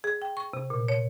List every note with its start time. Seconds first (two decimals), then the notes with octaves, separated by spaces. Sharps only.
0.04 G#4
0.22 G5
0.37 C#6
0.53 C3
0.70 A#2
0.88 C#5